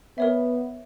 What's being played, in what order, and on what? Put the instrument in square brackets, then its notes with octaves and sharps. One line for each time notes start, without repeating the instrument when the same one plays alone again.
[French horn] B3 [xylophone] A#4 C#5 E5